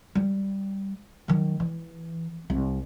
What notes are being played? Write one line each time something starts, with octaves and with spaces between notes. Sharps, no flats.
G3
D#3 F#3
E3
C2